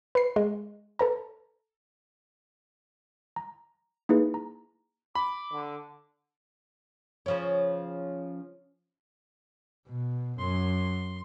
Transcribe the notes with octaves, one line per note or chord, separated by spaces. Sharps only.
B4 C7
G#3
A4 B4 A#5
A#5
A#3 D#4 E4 G#4 B4
A#5
B5 D6
D3
C#3 F3 C#4
B2
F#2 C6